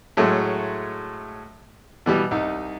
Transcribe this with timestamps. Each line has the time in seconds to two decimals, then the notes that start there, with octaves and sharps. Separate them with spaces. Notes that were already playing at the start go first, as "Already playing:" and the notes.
0.17 A2 F#3 G#3 A3
2.06 B2 E3 G3
2.31 C2 D#4